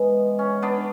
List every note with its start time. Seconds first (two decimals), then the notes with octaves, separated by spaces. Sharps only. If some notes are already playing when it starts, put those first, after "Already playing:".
Already playing: G#2 E3 G#3 B3
0.39 C#4
0.62 B3 D4